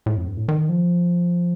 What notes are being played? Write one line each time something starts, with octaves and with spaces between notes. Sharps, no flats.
A2
F2
G2
A2
D#3
F3